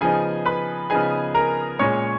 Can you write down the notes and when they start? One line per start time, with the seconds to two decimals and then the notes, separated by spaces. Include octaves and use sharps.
0.01 C#3 F3 B3 D#4 G#4 G#5
0.45 B4 B5
0.90 C#3 F3 B3 D#4 G#4 G#5
1.34 A#4 A#5
1.79 A#2 G#3 C#4 C#5 C#6